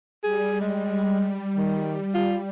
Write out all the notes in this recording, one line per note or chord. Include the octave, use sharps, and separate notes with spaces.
G3 G#4
G#3
D#3
F4